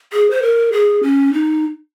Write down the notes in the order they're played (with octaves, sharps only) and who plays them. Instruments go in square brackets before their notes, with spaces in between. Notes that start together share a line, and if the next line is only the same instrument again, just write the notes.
[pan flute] G#4
C5
A#4
G#4
C#4
D#4